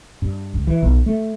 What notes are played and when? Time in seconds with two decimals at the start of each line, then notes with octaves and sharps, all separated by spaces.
0.22 G2
0.54 C#2
0.67 E3
0.83 B1
1.06 A3